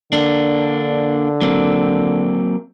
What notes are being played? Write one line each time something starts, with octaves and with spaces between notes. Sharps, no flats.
D3 A#3 D4
F#3 A#3 C4